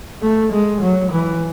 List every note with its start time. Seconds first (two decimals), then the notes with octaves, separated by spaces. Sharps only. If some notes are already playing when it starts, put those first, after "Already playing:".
0.22 A3
0.52 G#3
0.81 F#3
1.11 E3